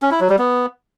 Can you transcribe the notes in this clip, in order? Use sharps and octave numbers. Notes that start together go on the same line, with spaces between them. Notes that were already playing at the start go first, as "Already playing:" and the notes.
C#4
E4
F#3
G3
B3